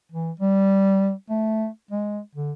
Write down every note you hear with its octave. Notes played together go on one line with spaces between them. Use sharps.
E3
G3
A3
G#3
D3